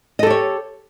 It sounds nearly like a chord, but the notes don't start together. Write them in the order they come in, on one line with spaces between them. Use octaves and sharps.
D#5 A4 G4 C#5